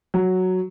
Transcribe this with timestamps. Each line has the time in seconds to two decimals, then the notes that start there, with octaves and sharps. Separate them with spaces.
0.14 F#3